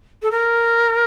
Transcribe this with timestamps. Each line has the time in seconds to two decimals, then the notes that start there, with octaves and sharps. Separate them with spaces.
0.23 A4
0.31 A#4